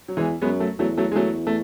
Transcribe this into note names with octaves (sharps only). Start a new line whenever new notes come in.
F#3
E2 E3 G#3
F#2 G#3 B3
F#3 A3
E2 F#3 A3
F#3 A3
G#3
F#3 A3
A3